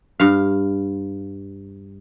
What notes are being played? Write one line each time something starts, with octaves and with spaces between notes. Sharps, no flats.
G2 F5